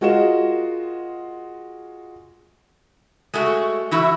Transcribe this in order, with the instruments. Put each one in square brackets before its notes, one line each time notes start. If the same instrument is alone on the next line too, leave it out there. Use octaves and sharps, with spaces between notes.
[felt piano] G#3 F4 F#4 A#4 D#5 E7
[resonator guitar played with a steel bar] G#3 A3 F#4
E3 E4 F#4